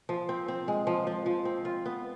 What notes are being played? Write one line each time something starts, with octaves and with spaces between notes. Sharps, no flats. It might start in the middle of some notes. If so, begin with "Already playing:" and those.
F3
C4
C4
G#3
F3
F3
F3
C4
F4
B3